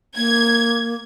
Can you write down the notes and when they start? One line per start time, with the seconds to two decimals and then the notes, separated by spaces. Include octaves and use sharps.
0.17 A#3 G#6